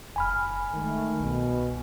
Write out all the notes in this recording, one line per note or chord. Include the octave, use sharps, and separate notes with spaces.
F#1 G#5 B5 F6
D#3 G#3 A3
C2 B2